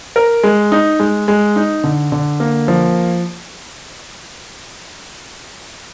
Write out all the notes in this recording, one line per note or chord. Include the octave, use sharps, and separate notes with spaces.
A#4
G#3
D#4
G#3
G#3
D#4
D3
D3
A#3
F3